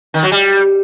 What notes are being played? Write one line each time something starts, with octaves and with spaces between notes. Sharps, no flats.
D#3
F#3
G3